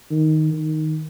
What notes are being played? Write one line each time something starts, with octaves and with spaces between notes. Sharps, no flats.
D#3
D#3